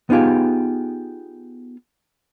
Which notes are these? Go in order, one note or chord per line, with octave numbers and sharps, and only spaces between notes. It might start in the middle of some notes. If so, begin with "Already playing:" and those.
B3 D#4 F4 G4 G#4